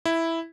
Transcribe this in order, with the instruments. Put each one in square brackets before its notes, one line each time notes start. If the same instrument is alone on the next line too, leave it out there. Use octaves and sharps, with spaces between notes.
[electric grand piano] E4